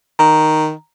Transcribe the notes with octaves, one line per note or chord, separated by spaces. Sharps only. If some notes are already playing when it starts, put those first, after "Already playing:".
D#3 A#5